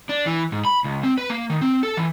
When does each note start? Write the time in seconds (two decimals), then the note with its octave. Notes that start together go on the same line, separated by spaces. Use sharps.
0.09 D4
0.26 E3
0.52 G#2
0.65 B5
0.84 C#2
1.03 C4
1.18 B4
1.30 A#3
1.50 D#3
1.61 C4
1.83 A4
1.97 E3